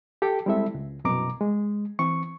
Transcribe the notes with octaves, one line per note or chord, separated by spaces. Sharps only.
G4 A4 G5
G3 G#3 C4 E4 A4 E5
C#2
C2 F#2 B2 A#5 D6
G#3
E3 C4 C#6